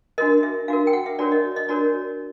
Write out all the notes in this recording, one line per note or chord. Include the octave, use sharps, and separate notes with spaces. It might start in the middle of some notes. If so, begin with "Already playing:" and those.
D4 F#4 A#4 D#5
E5
D4 F#4 A#4 F5
G5
F#5
E5
D4 F#4 A#4 C#5 D5
D#5
D#5
D4 F#4 A#4 C#5 D5